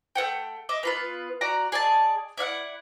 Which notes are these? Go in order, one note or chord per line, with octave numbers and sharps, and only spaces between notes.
A3 C5 F#5 G5
D#5 E5 D6
B3 F4 B4
F#4 D5 A#5
G#4 D5 D#5 A5
E4 D5 F5 F#5